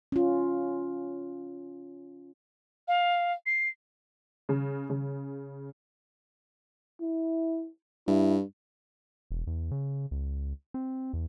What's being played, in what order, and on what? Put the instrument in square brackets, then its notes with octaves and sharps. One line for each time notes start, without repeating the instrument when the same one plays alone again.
[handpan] C#4 F4
[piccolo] F5
C7
[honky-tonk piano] C#3
C#3
[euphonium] E4
[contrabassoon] G2 [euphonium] E4
[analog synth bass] E1
E2
C#3
C#2
C4
E2